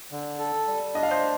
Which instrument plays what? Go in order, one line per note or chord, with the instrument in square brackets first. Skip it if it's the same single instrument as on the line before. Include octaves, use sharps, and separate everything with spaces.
[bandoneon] D3
A4
G3
[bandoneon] D4 [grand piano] D#5
[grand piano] F5
C5 D#5